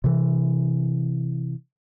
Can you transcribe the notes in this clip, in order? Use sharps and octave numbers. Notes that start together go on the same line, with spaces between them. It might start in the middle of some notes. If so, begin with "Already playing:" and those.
C3 E3